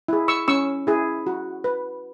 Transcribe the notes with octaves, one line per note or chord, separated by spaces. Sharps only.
E4 G#4
C#6 E6
C#4 C#6 E6
E4 G#4
F#4
B4